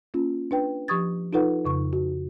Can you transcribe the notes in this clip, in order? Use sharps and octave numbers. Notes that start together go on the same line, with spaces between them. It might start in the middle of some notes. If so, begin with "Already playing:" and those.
A#3 C#4 F4
D4 B4 G5
F3 G4 C#6 D#6 G#6 A6
D#4 F4 A4 B4 F#5
F2 C#3 C#6
F#4